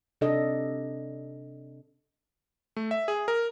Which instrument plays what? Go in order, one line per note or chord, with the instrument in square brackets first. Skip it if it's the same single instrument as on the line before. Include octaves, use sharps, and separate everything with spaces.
[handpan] C3 D4 A4 D#5
[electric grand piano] A3
E5
G#4
A#4